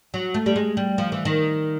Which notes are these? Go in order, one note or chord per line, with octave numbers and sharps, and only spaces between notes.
F#3
A3
G3
G#3
G3
F3
E3
D#3